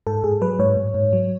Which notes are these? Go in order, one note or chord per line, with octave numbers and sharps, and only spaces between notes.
G#2 A4
G#2 G#4
F#3 B4
G#2 C#5
G#2
G#2
F#3